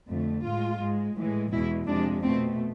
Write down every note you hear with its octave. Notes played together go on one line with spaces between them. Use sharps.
F2 D3 A3
A2 G#3 F4
G#2 G#3
A2 E3 G#3
E2 B2 G#3 E4
F2 C3 G#3 D4
B2 A3 C4